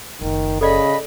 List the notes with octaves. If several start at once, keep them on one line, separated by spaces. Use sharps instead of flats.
F#1 D#3
C#3 A4 D5 D#5 B5